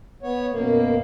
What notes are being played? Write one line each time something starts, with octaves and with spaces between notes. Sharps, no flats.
B3 C#5
F#2 B2 A#3